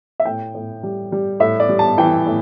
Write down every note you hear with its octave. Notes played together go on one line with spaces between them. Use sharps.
E5
A2 G5
A2
G3
G3
A2 E5
D5
G3
A5
E3 G5
A2